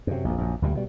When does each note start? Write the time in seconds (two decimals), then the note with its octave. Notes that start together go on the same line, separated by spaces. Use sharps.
0.07 F#2 C3
0.25 A#1 F2
0.38 A#1 F#2
0.62 D2 A#2 G3
0.75 B2 G3